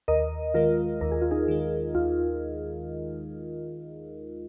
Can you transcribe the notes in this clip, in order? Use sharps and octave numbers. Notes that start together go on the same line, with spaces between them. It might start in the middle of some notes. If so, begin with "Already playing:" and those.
D#2 A#4 D#5
D#3 G#3 F4 A#4
D#2 A#4
G#4
F4
D#4 G#4
D#3 G#3
D#2 F4